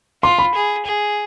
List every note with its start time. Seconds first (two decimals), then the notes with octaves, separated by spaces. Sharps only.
0.23 F4 C6
0.39 B5
0.55 G#4
0.86 G#4